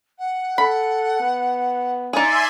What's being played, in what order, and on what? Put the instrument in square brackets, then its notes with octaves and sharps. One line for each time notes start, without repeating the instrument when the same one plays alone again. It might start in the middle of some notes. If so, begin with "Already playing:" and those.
[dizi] F#5
[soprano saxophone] A4 [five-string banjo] B5
[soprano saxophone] B3
[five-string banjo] D#4 G#4 [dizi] D5 [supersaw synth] E5 G#5 C6